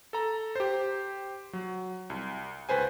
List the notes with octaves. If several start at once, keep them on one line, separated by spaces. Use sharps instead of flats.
A4 A#5
G4 C5
F#3
C2
C#2 B4 C5 G#5